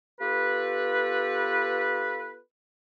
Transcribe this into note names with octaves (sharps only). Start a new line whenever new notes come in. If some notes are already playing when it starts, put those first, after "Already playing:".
B3 F4 G4 A4 B4